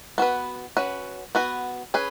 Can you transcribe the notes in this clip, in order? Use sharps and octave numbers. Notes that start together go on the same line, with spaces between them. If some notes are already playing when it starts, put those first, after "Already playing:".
B3 F#4 B4
C#4 F#4 B4
B3 F#4 B4
C#4 G#4 B4